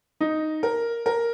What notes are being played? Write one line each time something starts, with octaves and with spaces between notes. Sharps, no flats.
D#4
A#4
A#4